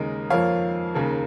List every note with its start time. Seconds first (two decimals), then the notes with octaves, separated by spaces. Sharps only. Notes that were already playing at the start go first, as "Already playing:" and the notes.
Already playing: D#2 C#3 G#3 A#4 D#5
0.30 F2 F3 A#3 C#5 F5
0.94 D#2 C#3 A#3